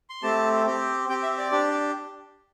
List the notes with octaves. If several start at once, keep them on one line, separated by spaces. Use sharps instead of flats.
C6
A3 C4 G4 A5
C4 G4
C4 G4 G5
E5
D5
D4 G4